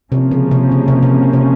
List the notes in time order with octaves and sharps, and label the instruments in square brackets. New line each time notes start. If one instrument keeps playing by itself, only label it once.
[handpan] C3 [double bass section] F3 A#3 C#4
[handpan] C#3
C3
C#3
C3
C3
C3